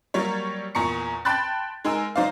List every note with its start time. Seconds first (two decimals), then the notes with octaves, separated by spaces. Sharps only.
0.14 F#3 G3 A#3 C#5
0.75 E2 A#2 A#5 C#6 C#7
1.25 G5 A5 B5 C6 F#6 A6
1.85 G#3 D#4 A#4 G#5 E6
2.16 F#3 D#4 C5 D5 F5